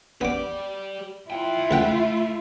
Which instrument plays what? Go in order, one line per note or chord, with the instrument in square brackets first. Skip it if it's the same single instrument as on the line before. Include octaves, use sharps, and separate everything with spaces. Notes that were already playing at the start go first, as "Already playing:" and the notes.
[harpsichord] B3 D6 [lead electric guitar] G4 D5
[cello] E4 F4 [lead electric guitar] F5 G5
[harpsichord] C#2 F#5 G5 [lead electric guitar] A3